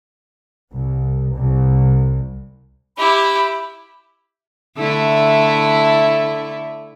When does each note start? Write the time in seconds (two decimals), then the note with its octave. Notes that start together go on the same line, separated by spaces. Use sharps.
0.73 C2
1.36 C2
2.98 E4 G4 B5
4.78 D3 A3 E4